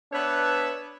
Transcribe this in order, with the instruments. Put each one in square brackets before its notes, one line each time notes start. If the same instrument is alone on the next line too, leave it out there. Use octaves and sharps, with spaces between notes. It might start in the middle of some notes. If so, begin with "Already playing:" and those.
[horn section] B3 D4 B4 C#5 E5